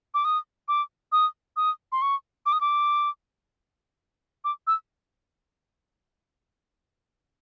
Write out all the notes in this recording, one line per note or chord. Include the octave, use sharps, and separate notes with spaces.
D6
D#6
D6
D#6
D#6
C6
C#6
D6
D#6
D6
D6
E6